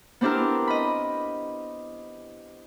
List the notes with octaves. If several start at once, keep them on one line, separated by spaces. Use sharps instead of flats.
B3 C4 D4 E4 G4 A#4
D#5 B5